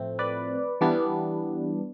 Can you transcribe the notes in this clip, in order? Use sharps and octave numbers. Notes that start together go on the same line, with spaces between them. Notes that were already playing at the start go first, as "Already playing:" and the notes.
Already playing: A2 F3 A3 C4
B4 D5
E3 G3 B3 D4